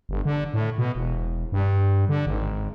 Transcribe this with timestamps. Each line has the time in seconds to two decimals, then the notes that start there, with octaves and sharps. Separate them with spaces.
0.09 G1
0.25 D3
0.54 A2
0.78 B2
0.95 E1
1.52 G2
2.09 D3
2.26 G#1